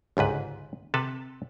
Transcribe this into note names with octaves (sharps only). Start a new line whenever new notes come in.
G1 C#2 G#2 B4
C3 A4 B4 A5